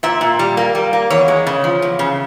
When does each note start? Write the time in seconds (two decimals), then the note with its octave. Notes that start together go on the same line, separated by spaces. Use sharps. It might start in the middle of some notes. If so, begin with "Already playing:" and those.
0.03 A#2 E5
0.21 A#2
0.39 G3
0.57 A#3
0.75 G3
0.93 A#3
1.10 E2 C#5
1.28 G#3
1.47 C#3
1.64 F3
1.82 E2
1.99 C#3